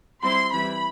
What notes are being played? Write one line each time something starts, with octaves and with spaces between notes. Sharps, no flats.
G3 C4 E4 C6
E3 G3 C4 E4 B5